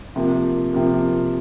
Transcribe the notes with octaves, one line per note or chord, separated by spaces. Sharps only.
C3 F3 A#3
C3 F3 A#3